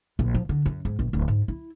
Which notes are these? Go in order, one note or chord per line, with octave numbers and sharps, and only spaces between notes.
A#1
F3
D3
F#2
G#2
A#1
D1
G#2
E4